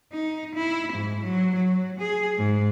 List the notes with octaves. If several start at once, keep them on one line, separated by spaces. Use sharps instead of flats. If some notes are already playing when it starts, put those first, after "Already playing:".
D#4
E4
G#2
F#3
F#3
G#4
G#2